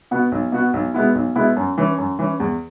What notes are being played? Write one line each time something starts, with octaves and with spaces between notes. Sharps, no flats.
B2 B3 F#4
B1
B2 B3 F#4
B1
B2 G#3 B3 E4
B1
B2 G#3 B3 E4
F#2
E3 C#4
F#2
E3 C#4
E2